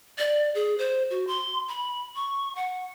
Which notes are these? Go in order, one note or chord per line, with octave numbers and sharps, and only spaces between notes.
D5
G#4
C5
F#4
C6
B5
C#6
F#5